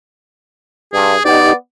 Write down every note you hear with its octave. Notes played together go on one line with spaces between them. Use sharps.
G2 G#4
B3 D#4 G4 D5